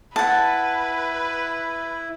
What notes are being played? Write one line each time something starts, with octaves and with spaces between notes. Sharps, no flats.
E4 B4 F#5 A5